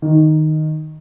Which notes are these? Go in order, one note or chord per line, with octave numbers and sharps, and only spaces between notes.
D#3